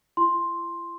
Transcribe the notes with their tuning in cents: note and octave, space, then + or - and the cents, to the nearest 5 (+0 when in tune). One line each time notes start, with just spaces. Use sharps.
E4 +45 C6 +5